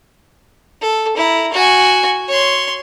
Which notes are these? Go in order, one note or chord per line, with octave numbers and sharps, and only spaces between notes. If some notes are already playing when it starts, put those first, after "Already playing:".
A4
E4 A#5
F#4 G#5
C#5 C6